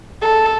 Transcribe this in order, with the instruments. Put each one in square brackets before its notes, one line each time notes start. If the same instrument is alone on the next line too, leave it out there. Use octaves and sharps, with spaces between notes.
[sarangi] A4